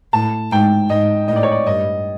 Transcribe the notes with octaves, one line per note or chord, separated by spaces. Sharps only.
A2 A5
G#2 G5
G#2 D#5
A2 D#5
D5
C#5
D5
G2 D#5